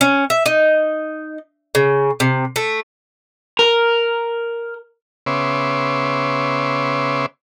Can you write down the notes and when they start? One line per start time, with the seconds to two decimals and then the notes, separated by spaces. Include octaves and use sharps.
0.01 C#4
0.30 E5
0.46 D#4
1.75 C#3
2.20 C3
2.56 A3
3.59 A#4
5.26 C#3 B3 C#5 E5 C6 D6